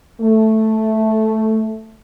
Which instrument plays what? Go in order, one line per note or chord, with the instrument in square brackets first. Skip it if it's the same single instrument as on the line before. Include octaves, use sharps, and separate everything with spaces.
[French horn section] A3